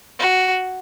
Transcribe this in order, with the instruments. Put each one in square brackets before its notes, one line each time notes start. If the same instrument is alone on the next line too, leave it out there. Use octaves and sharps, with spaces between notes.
[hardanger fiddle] F#4